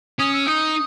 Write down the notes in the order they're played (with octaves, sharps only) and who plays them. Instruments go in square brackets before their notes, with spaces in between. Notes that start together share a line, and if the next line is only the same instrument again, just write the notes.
[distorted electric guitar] C#4 [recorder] D#6
[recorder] E6
[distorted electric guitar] D#4 [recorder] D#6